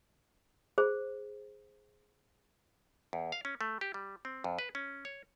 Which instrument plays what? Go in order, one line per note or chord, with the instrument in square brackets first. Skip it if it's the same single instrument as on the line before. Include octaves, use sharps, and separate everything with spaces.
[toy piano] G#4 C5
[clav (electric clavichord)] E2
F5
C#4
A3
G4
G3
C4
F2
B4
C#4
C#5